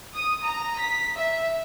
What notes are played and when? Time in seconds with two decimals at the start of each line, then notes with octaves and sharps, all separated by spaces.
0.14 D#6
0.44 A#5
0.80 B6
1.16 E5